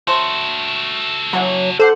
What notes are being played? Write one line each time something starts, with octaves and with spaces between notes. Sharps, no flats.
F#3 A3 F#4 A4 C5
D#3 E3 F#3 C#4
D4 G4 A4 C5 F#5